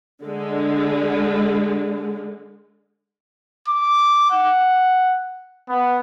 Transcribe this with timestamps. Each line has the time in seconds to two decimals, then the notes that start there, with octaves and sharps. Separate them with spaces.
0.23 D3 G#3
3.68 D6
4.31 F#5
5.69 B3